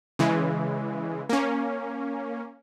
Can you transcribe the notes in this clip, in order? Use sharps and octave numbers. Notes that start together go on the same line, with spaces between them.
C#3 E3 G#3
A#3 C#4